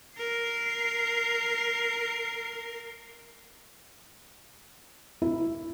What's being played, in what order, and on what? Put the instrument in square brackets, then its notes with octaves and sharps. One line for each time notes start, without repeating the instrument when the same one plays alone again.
[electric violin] A#4 C7
[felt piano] E4